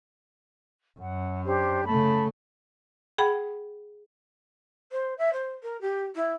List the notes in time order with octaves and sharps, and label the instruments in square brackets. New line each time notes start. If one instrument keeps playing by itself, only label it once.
[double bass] F#2 [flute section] F#5
[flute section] D4 G4 C5
[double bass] C#3 A3 [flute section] A5 B5
[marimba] G#4 F#5 G5 B5
[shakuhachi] C5
E5
C5
A#4
G4
E4